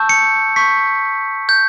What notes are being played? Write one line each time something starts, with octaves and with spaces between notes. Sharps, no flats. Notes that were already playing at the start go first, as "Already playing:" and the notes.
Already playing: A5 C#6 E6 G6
C#7
C#6 G6 B6
G6